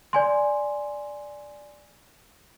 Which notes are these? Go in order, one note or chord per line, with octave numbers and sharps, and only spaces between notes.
D5 G#5 C6